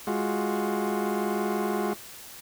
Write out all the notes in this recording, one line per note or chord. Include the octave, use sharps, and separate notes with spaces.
G#3 F4 F#4